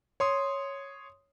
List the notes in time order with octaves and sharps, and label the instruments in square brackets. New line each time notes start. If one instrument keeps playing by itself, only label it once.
[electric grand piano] C#5 C6 D#6